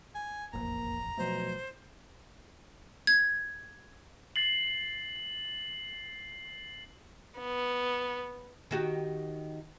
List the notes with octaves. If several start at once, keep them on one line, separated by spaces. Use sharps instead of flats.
G#5
E1 A1 F2 A#3 A#5
B2 F3 F#3 A3 C5
G#6
A6 C7 F#7
B3
D#3 F#4 G4